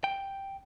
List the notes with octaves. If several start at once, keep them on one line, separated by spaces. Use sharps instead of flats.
G5